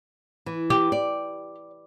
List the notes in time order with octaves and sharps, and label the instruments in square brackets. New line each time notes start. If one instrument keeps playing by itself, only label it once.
[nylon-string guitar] E3
[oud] G4
[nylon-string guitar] D5